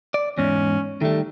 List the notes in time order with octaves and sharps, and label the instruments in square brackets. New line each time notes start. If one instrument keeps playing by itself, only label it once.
[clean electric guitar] D5
[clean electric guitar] E2 G#2 [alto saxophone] C#4
[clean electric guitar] D#3 G3 [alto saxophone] A3